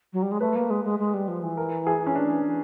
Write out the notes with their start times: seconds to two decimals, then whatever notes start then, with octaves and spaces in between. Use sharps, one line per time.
0.13 F#3
0.22 G3
0.31 G#3
0.40 A3 B4
0.55 A#3
0.70 G#3
0.84 G#3
0.99 G#3
1.14 G3
1.28 F3
1.43 E3
1.57 A#4
1.87 G#4
2.06 C#4
2.15 D4